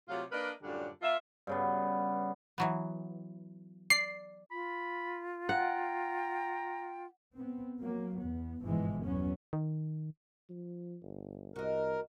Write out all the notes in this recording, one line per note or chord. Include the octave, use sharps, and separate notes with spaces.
C3 F#3 A3 F4
A#3 D4 A#4 B4 D5 D#5
F#2 A2 D3 G3 D4 F4
A#3 F4 E5
G2 C#3 B3
E3 F#3 B3
D5 C7
F4 B5
F#5 G5 A#5
B3 C4
F#3 A#3
E2 B3
G1 G#2 B2 E3 F3 G#3
E2 F#3 B3 C#4
D#3
F3
G1
C2 F#4 A#4 D#5